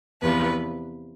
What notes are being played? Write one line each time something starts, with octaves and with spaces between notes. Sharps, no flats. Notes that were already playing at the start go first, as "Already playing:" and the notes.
E2 C3 F3 B4